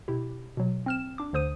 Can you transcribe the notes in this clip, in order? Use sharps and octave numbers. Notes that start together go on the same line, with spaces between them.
B2 E4 G4
B2 F#3
C4 F6 E7
D4 D6
D2 D3 C5 D#6 D#7